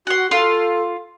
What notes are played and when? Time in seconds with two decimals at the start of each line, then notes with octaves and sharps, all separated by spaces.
0.07 F#4 F#5 C6
0.31 F4 A4 C6